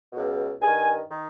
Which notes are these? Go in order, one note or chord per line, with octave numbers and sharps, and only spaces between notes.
C#2 B2
G2 D#3 G#5
D#3